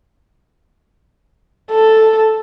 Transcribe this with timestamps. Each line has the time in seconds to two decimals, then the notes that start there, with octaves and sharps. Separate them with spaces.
1.71 A4